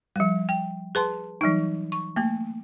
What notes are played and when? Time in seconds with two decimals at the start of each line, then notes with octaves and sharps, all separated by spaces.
0.16 F3 G3
0.49 G5
0.95 G#4 B4 A5 C6
1.41 E3 F#3 G3 D#4
1.92 C#6
2.16 A3 A#3